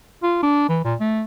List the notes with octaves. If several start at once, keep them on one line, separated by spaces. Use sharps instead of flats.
F4
D4
E3
A#2
A3